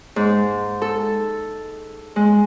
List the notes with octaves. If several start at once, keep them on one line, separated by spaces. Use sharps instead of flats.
G#2
A4
G#3